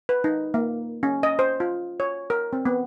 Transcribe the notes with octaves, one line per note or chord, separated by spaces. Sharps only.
B4
D#4
A#3
C#4
D#5
C5
F4
C#5
A#4
C4
B3